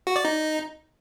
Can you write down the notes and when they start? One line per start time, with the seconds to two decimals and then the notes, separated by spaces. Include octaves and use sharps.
0.07 F#4
0.16 D5
0.25 D#4